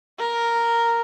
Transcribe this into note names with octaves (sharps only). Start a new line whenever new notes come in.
A#4